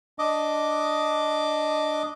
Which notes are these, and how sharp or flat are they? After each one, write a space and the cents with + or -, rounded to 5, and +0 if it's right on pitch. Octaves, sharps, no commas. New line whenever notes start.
D4 +0 D#5 +0 D6 +0